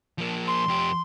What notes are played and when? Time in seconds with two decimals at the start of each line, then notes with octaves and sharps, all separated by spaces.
0.18 F3 A#3
0.48 C6
0.68 F2 G4